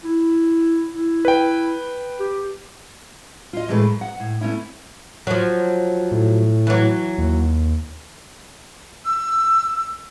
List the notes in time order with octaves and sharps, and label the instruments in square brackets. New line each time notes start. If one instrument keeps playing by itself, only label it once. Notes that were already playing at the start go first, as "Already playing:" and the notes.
[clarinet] E4
E4
[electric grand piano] B4 G5
[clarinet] G4
[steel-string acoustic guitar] F4 D#5
A2 E3 G#3 A3 B4
F#2
F#5
A2
A3 B3 C#4 E4
[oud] F3 F#3
[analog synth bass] A2
[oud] E3 F#3
[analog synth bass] D#2
[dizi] E6